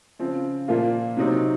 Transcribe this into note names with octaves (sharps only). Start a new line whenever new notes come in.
C#3 F3 C4
A#2 F3 A#3 F4
C3 F#3 C4 D#4